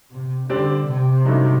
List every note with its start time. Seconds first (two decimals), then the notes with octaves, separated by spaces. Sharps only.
0.12 C3
0.49 D3 G3 C4 G4 D5
0.87 C3
1.25 G2 F#3 A3 D#4